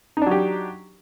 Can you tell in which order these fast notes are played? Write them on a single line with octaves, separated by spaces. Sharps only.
D#4 D4 F#3 G4